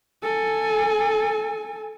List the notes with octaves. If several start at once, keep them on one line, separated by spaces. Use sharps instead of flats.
A4 G#5